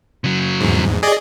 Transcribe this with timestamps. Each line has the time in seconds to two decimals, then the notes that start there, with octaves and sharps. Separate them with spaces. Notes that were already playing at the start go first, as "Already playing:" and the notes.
0.24 C#3 F#3
0.61 E2 G#2
1.03 G#4 D5 D#5